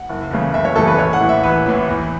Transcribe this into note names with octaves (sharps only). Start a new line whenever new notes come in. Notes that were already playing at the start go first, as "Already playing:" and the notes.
Already playing: F#5
F#1
E2 C#3 A3
F#1 E5
C#5
E2 C#3 A3 A4
B4
A1 C#5
F#5
A2 E3
E5
A1 B4
A2 E3
E2